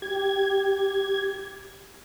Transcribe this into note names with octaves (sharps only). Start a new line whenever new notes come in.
G4 G#6